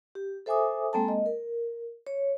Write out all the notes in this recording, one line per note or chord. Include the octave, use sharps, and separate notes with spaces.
G4
A4 C5 E5 G#5 D6 D#6
G#3 A#3 C4 A4 G5 A5
D#5
A#4
C#5